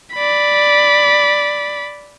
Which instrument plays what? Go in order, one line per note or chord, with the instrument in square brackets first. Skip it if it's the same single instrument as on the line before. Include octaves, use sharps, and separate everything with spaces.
[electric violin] D5 B5